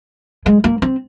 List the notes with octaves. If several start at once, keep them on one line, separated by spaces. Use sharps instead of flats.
G#3
A#3
C4